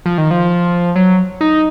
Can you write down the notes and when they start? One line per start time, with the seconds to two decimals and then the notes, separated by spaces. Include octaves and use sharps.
0.06 F3
0.18 D#3
0.31 F3
0.96 F#3
1.41 D#4